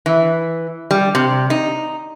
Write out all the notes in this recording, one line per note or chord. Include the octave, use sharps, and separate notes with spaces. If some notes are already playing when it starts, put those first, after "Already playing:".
E3
G3
C3
D#4